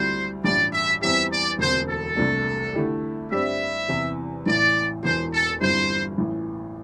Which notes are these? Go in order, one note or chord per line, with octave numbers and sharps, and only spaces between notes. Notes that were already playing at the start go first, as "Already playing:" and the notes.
Already playing: D2 D3 G3 C4 E4 C5
A1 G2 G3 D4 G4 D5
E5
E2 E3 G3 C4 G4 E5
D5
E1 D2 D3 C4 C5
A4
C2 C3 A3 D4
D3 A3 E4 G4
G2 G3 C4 G4 D5 E5
E2 C3 E3
A1 A2 E3 D5
E1 E2 E3 C5
A4
G1 G2 G3 C4 E4 C5
A1 A2 E3